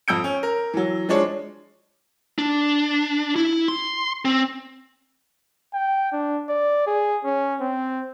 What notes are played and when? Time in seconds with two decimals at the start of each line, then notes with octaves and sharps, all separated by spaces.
0.08 F2 E6 G6 D7
0.24 C#4
0.43 A#4
0.73 E3 F#3
1.09 F3 G#3 D4 C#5
2.38 D4
3.36 E4
3.68 C6
4.25 C4
5.74 G5
6.12 D4
6.49 D5
6.87 G#4
7.24 C#4
7.61 C4